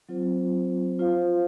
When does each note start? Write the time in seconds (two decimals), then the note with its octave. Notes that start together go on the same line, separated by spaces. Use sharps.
0.09 F#3 C4 F4 C5
0.99 F4 C5 F5